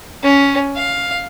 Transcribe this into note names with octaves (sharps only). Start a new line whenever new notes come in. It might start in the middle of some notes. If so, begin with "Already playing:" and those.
C#4
F5